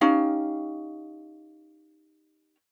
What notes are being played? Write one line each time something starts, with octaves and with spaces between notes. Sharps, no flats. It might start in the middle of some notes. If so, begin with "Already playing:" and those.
C#4 D#4 G4 F5